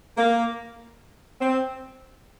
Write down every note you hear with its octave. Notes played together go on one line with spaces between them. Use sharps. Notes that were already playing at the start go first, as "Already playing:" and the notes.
A#3
C4